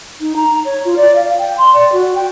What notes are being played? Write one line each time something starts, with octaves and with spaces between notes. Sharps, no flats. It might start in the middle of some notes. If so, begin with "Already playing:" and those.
D#4
A#5
C#5
F4
D5
F5
G5
C6
D5
F#4
G5